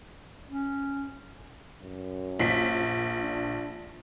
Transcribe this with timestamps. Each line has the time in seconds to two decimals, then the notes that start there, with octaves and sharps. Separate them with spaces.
0.48 C#4
1.82 F#2
2.39 A#1 B6
3.20 D4